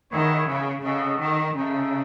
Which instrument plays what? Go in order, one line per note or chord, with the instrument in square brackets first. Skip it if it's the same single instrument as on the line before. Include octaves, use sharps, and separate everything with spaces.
[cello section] D#3 [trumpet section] B3 E4 G#4 C#5 F#5
[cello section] C#3
[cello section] C#3 [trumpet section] F#4 A4 D#5
[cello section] D#3
[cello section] C#3 [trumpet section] D#4 A4 E5